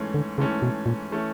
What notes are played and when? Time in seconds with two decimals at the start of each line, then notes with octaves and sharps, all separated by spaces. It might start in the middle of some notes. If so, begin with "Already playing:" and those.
Already playing: G#2 E3 A3 C#4
0.14 D3
0.37 G#2 C#3 E3 A3 C#4
0.62 B2
0.86 A#2
1.11 E3 A3 C#4